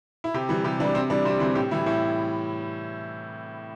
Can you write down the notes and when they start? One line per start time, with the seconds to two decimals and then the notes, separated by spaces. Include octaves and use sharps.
0.24 E4
0.34 C3 G4
0.49 E3 G3
0.64 C3 G4
0.80 E3 D4
0.84 G3
0.95 C3 C4
1.10 E3 G3 D4
1.25 C3 C4
1.40 E3 C4
1.45 G3
1.55 A2 G4
1.71 E3 G3 E4
1.86 A2 E4